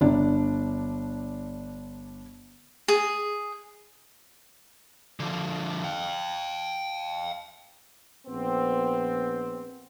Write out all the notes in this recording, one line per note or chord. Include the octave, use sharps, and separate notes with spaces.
G1 D4
G#4
D3 F3
F5 G5
A#1 B3 C4